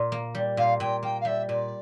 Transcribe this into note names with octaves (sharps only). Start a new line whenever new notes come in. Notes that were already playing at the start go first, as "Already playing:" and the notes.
Already playing: A#2
A#3
G3
A#2 F5
A#2 G5
A#3 G5
F5
G3 E5
A#2 D5